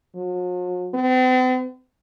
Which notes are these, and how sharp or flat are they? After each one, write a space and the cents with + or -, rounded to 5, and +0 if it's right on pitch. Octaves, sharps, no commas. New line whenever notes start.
F#3 -45
C4 -45